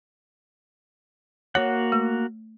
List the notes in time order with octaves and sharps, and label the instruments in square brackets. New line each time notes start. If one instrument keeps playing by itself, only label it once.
[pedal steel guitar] A#3 F#4 F#5 [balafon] C#5
[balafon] A3